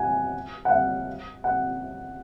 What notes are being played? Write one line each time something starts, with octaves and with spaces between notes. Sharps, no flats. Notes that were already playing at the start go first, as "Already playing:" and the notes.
Already playing: F#5 G#5
F#5
F5
F#5